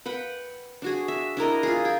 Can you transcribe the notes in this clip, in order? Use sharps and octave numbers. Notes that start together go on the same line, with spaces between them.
B4 F#5 G5
D4 F#4 G#4
E5
D4 E4 A#4 D#5
F4 G#4
G#4 G5